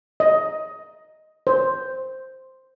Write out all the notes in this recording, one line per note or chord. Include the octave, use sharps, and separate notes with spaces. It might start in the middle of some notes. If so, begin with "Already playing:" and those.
D#5
C5